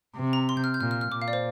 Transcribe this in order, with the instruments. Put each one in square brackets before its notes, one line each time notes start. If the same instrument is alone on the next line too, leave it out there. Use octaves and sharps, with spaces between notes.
[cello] C3
[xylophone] A#5
C6
G6
F6
G6
[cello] A#2 [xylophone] F6
[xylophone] F6
F6
[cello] A#2 [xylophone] D6
[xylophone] F5
D5
C5